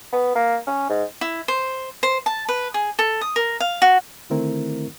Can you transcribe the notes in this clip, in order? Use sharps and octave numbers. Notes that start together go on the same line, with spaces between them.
B3
A#3
C#4
G#2
E4
C5
C5
A5
B4
G#4
A4
D#6
A#4
F5
F#4
D3 D#3 A3 C4 E4 A#4